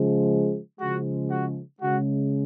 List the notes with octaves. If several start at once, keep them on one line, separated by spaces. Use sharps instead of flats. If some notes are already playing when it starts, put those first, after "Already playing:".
Already playing: C#3 F3 G#3
C#3 F3 G#3 F#4
F#4
C#3 G#3 F#4